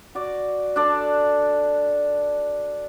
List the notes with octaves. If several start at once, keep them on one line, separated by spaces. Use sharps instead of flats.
F#4 D5
D4 A4 D5